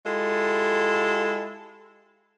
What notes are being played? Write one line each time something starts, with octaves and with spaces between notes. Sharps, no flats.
G#3 E4 F4 G4 A4